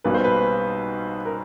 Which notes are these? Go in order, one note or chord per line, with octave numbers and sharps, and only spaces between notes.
B1 B2 G3 A#3 B4
C5
B4
A#4